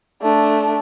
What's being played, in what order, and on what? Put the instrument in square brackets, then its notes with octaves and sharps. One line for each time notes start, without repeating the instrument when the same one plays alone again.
[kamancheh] A3 D4